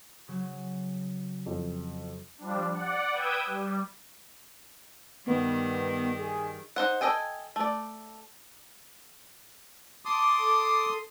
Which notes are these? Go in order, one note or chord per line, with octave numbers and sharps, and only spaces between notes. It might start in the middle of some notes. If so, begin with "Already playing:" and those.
C#3 F#3
F2
F3 G3 D4
D5 F#5
B4 G5 D#6 E6 G6 G#6
G3
G2 D#3 B3
G#4
D#4 C5 F#5
A4 C5 D#5 G5 G#5
A3 D5
A5 C6 D6 D#6
A4